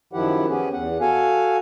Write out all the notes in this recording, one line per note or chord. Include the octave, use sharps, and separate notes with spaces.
F#2 D#3 F3 E4 G4 F#5
B3 C#4 G4 G#4
E2 F#5
F#4 A4 F5 G#5